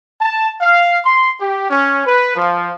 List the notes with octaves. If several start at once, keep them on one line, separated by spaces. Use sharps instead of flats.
A5
F5
C6
G4
C#4
B4
F3